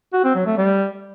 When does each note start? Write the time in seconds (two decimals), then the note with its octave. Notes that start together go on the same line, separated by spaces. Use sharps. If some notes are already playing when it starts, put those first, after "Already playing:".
0.13 F#4
0.24 C4
0.35 F#3
0.46 A3
0.57 G3